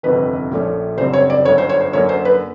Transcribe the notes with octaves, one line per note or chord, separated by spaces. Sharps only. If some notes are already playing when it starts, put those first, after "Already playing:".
G1 F2 C3 D#3 B4
A#1 A#2 F3 A3 C#4
F#1 F#2 D3 G3 C4 C5
C#5
D5
G1 F#2 D3 C#5
C5
C#5
C5
F#2 D3 F#3 A#3 C#5
C5
B4